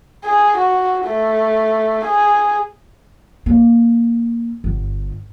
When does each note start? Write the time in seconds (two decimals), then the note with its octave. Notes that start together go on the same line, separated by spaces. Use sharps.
0.25 G#4
0.58 F#4
1.06 A3
2.05 G#4
3.46 A#3
4.64 G1